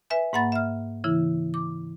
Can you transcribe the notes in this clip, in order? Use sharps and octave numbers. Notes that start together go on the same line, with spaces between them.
B4 E5 G#5
G#2 A#3 F#5 B5 A6
E5 F6
C#3 E3 E4
D6